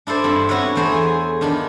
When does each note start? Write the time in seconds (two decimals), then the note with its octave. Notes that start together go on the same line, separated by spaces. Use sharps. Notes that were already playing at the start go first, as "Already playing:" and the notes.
0.07 D4 E4 A4 C5 D5
0.24 G2 C4 B5
0.49 B3 E4 F#4 B4 C#5
0.75 E2 A3 C5 C#5 B5
0.92 G#4 G#5
1.41 D#3 D4 F4 B5